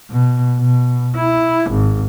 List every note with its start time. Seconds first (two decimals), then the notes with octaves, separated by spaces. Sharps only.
0.10 B2
0.59 B2
1.16 E4
1.71 G#1